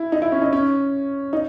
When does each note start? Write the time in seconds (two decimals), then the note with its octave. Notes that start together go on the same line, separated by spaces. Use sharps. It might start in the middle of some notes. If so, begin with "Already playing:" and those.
Already playing: E4
0.12 D#4
0.22 E4
0.32 C#4
0.42 D#4
0.53 C#4
1.33 D#4